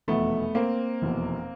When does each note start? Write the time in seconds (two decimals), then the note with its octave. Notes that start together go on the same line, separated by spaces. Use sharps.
0.08 F1 E2 B2 A3 B3
0.55 A#3 C4
1.02 F1 E2 B2